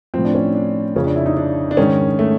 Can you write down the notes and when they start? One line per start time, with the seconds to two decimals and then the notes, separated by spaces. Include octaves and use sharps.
0.14 A2 F3 C4
0.25 D4
0.35 C#4
0.55 D4
0.96 F2 C#3 F3 C#4
1.07 D4
1.16 E4
1.26 D#4
1.37 D4
1.71 D4
1.77 G#2 D#3 C#4
2.19 A3